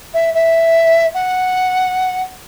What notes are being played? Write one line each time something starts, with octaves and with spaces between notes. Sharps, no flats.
E5
E5
F#5